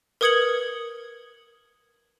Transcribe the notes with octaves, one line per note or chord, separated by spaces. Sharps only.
A#4 B4 D#6 G#6 C#7 F#7